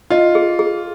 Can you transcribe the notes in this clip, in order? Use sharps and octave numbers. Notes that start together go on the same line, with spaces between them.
F4 D#5
G#4
G#4